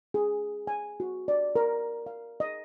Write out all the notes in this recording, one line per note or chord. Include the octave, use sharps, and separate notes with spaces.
G#4
G#5
F#4
D5
A#4
F5
D#5